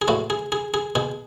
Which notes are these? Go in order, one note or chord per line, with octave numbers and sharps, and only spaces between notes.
G#4
A2 E3 F#4
G#4
G#4
G#4
B2 G#4